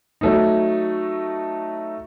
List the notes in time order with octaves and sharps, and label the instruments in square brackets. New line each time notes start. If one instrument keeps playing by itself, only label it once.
[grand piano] F#3 A3 D#4